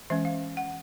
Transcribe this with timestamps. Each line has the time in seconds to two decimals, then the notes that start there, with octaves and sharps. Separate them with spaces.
0.10 E3 G#3 C#4 E5
0.25 F5
0.57 F#5